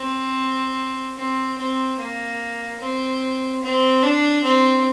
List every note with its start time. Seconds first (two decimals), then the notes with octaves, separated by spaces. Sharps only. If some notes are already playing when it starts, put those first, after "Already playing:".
Already playing: C4
1.17 C4
1.58 C4
1.98 A#3
2.80 C4
3.63 C4
4.03 D4
4.43 C4